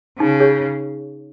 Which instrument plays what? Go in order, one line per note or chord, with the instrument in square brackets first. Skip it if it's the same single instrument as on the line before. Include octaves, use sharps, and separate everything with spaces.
[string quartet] C#3 [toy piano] D#4
[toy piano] G#4 C#5